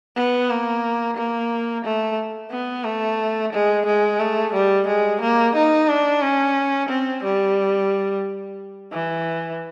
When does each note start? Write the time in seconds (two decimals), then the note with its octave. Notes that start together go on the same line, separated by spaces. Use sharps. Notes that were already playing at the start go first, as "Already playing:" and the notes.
0.16 B3
0.50 A#3
1.17 A#3
1.84 A3
2.51 B3
2.84 A3
3.53 G#3
3.86 G#3
4.19 A3
4.53 G3
4.87 G#3
5.21 A#3
5.55 D#4
5.88 D4
6.22 C#4
6.89 C4
7.24 G3
8.92 E3